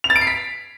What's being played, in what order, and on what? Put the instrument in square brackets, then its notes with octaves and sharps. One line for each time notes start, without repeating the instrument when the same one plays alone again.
[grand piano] F7
A6
D7
C7
B6